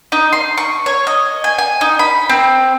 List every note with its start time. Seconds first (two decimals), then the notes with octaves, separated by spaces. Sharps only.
0.12 D#4
0.33 C6
0.58 C#6
0.86 C#5
1.07 D#5
1.44 G#5
1.58 G#5
1.81 D#4
1.99 B5
2.30 C4